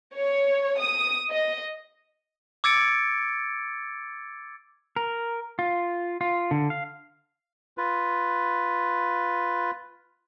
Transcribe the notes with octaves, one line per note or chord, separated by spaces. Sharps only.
C#5
D#6
D#5
D6 E6 G#6 A6 C#7 D7
A#4
F4
F4
D3
F5
F4 B4